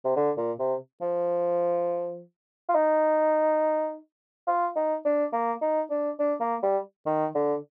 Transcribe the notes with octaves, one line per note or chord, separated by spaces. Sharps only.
C3
D3
A#2
C3
F3
F4
D#4
F4
D#4
D4
A#3
D#4
D4
D4
A#3
G3
D#3
D3